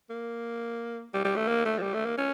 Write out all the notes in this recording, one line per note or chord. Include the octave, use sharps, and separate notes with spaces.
A#3
G3
G3
A3
A#3
A3
F3
G3
A3
A#3
C#4